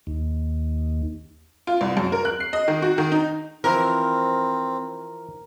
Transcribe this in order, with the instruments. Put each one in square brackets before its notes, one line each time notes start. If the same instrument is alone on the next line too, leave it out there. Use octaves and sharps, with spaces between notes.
[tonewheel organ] D#2
[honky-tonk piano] F4
C2
F#2
A#4
F#6
C7
D#5
D#3
F#4
D#3
D#4
[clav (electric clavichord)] E3 F3 E4 [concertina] C4 [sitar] A#4